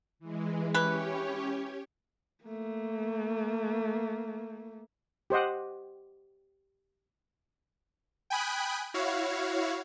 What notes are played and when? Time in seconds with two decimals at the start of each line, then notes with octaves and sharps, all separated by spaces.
0.19 E3 G#3
0.74 E3 C#4 G4 B4 C#5
2.44 A3 A#3
5.30 G4 C5 D#5 F#5
8.30 G5 G#5 B5 D#6 F#6
8.94 E4 F#4 C#5 F5